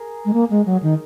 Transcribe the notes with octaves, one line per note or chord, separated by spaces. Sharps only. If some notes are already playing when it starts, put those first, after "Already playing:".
Already playing: G#4 A#4
G#3
A#3
G#3
F#3
D#3